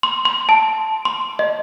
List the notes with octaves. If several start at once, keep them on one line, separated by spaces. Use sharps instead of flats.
C6
C6
A5
C6
D#5